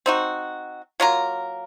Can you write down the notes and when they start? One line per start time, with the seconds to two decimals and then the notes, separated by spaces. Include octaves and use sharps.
0.06 C4 D#4 F#4
1.00 F#3 A#3 F4 A#4